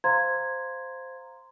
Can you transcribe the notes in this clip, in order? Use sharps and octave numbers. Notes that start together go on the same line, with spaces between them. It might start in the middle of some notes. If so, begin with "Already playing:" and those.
C5 F5 A#5 C6 G#6